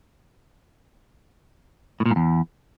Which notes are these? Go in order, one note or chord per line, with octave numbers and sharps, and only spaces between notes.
A2
A#2
G#2
E2